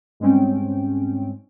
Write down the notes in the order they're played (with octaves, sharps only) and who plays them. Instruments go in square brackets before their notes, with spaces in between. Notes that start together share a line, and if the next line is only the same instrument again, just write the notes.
[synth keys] G#2 G3 G#3 C4 C#4 G5